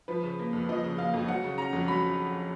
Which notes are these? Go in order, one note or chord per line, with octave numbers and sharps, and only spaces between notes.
F3 B4
C#3
A#3
F2
F3 D#5
C#3
A#3 F5
F2
F#3 F#5
C#3
C#4 A#5
F2
F#3 B5